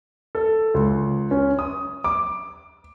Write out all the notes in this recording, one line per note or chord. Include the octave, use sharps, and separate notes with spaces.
A4
C#2
C#4
D#6
D6